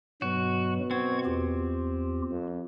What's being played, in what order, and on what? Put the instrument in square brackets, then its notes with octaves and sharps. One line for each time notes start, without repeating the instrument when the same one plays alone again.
[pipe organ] G2 F#3 [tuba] B2 [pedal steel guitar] F#4
[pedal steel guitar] C4 [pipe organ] F#5 C#6 G#6
[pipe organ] E2 F4 G4
[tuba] F2